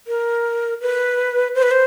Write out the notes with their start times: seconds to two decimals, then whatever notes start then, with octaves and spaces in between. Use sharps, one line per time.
0.07 A#4
0.81 B4
1.55 C5
1.63 B4
1.71 C5